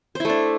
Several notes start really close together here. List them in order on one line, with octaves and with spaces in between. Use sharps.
C5 E4 A3 D4